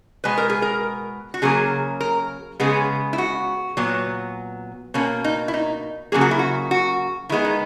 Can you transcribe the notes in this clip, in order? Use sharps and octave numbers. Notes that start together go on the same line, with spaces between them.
B2 G#3 B3 B4
A#4
G#4
A#4
F#4
C#3 F#3 A#3 G#4
A#4
C#3 G#3 B3 G#4
E4
F#4
A#2 F#3 B3
B2 A#3 C#4
D#4
E4
D#4
C#3 F#3 A#3 G#4
F#4
E4
F#4
F#4
D#3 G#3 B3 E4
D#4